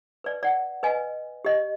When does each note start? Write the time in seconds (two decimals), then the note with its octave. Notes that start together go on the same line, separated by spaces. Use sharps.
0.24 B4 D5
0.43 D5 F#5
0.83 B4 D#5 G#5
1.45 G4 D#5